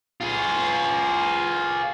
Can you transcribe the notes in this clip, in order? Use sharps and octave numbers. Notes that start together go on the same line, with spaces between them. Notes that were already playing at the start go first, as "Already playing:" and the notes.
F4 G#4